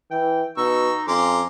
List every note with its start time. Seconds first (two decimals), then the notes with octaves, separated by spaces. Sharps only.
0.11 E3 G5
0.57 B2 D#4 C#6 E6
1.08 F2 C#4 A#5 C6 D6